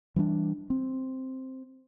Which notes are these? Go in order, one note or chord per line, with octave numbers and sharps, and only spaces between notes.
E3 G3 A#3 D4
C4